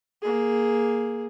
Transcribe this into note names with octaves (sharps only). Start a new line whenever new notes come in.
A#3 G#4